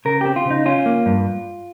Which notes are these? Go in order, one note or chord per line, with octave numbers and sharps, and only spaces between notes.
C#3 A#4
C4 G4
F4
C#3
D#4
C#4 F4
A#3
G2